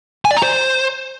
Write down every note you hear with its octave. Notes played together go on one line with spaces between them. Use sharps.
G#5
D5
A#5
C5